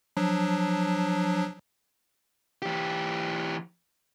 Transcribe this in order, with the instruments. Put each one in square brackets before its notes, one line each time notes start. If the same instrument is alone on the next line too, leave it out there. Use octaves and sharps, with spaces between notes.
[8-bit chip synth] F3 F#3 D4
[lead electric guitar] E3 G4